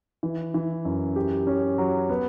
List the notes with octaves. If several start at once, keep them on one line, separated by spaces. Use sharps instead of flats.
E3
E3
F#2
G4
C#4
F#3
B3